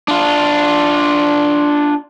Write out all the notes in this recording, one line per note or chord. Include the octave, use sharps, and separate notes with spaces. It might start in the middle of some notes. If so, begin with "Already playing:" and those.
D4 F4